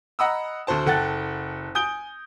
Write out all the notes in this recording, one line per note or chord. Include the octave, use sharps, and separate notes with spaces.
D#5 F#5 A#5 B5 D#6 E6
D2 F#4 C5 A5
F#1 A4 F#5 G5 F#6 A6
G#5 D#6 G6 D7 G7